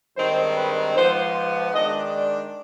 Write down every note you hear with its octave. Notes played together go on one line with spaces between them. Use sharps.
G2 D#3 G#3 C4 C5
B4
G#2 F3 B3 C5
C5
D#3 G#3 D4 D#5
D5